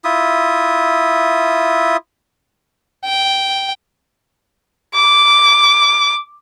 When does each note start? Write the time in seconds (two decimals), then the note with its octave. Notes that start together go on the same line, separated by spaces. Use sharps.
0.04 E4 F4 E5 D#6
3.05 G5
4.95 D6